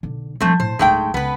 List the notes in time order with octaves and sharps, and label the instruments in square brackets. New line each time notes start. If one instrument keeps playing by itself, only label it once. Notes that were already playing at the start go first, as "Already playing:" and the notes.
[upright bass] B1 D3
[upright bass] F3 G3 [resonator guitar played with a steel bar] A3 C4
[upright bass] A2 [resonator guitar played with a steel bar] C5
[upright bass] D1 D#4 [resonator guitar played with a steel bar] G#3 A3 G5
[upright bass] C#2 [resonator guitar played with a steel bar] B3 B4